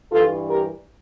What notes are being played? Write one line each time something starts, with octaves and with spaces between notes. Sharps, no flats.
G2 E3 G3 F4 A4
G4 A#4